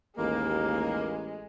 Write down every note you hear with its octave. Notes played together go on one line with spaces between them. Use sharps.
A1 D#2 G#3 A#3